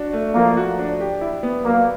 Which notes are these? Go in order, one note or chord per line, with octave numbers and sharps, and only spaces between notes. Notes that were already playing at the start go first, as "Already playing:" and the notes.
Already playing: D4 F#4
A3
F3 A#3
F#4
D4
G4
E4
B3
F#3 A#3